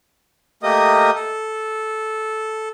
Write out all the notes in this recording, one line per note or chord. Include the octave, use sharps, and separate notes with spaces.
A3 A#3 G4 A#4 D#5 D#6
A4